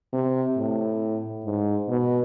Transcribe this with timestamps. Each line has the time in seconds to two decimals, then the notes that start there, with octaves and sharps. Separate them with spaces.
0.13 C3
0.57 A2
1.46 G#2
1.89 B2